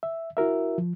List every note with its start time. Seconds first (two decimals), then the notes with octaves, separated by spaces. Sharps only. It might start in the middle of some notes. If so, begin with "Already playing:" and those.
0.03 E5
0.37 E4 F#4 A#4 E5
0.78 F3